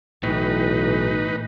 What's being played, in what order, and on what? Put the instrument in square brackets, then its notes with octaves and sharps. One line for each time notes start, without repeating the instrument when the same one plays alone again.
[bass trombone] B1 [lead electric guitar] A2 [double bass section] E3 [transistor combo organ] D#4 B4